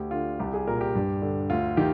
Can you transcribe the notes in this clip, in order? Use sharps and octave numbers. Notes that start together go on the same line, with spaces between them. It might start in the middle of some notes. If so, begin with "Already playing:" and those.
Already playing: D2 G4
D3 F4
C2 G4
G#4
A#2 A#4
G4
G2
D3
D2 F4
D#3 G4